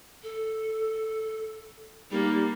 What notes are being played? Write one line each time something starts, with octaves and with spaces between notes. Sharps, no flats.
A4
G3 A#3 D#4